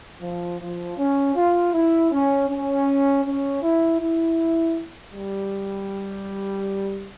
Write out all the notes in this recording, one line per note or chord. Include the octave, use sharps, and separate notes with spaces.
F3
F3
C#4
F4
E4
C#4
C#4
C#4
E4
E4
G3